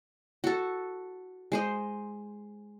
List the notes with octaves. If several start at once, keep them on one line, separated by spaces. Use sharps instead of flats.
F#4 A4
G#3 C5 D#5